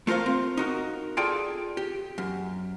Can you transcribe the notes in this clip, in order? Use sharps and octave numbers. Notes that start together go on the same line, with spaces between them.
A3 F4 A#4 C5 F5
C4
D#4 F#4 A#4
F4 G#4 A4 D5 G5
G4
F#2